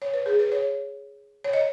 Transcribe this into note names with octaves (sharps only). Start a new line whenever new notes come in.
C#5
B4
G#4
B4
C#5
C#5
D#5